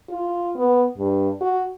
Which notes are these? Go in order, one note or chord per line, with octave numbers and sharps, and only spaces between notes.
F4
B3
G2
F#4